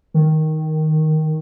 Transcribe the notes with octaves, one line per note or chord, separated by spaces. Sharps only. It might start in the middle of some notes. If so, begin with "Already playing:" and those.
D#3